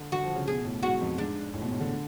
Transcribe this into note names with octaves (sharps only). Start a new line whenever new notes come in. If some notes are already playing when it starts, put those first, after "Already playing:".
Already playing: D3
D3 F#4
F3
C#3
B2 G#4
B2
A2
G#2 F#4
F2
G#2 D4
A2
B2
A2
D3